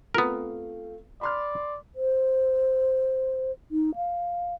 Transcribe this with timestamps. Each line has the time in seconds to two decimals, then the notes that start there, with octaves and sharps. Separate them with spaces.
0.15 A3 B3 C4 F4 A#4
1.21 D5 B5 C6 F6
1.96 C5
3.72 D#4
3.96 F5